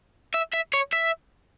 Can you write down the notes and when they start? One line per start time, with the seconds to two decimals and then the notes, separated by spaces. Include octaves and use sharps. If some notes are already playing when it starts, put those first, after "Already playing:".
0.34 E5
0.54 E5
0.74 C#5
0.93 E5